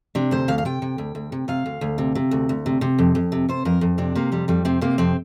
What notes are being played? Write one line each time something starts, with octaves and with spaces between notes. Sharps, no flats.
C3 D4
D2 C5
D2 F5
F5
C3 G5
C3
D2
D2
C3
C3 F5
D2
D2
C3
C3
D2
D2
C3
C3
F2
F2
C3
C3 C5
F2 A#4
F2
C3 D4
C3 A#3
F2 G3
F2 G3
C3 C4
C3 A#3
F2 C4